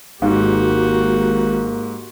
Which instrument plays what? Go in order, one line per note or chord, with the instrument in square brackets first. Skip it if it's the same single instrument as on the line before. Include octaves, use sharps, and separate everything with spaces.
[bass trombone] G#1 [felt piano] G#2 [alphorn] A#3 [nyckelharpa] F#4 G4